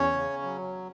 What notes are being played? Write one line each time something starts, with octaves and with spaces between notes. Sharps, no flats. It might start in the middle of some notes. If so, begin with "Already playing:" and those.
Already playing: E2 C#4 C#5
C#3
F#3